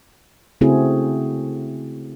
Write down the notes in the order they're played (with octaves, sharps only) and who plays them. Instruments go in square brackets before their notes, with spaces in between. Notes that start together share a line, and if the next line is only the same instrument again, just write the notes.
[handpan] C#3 A3 C4 E4 F#4 G#4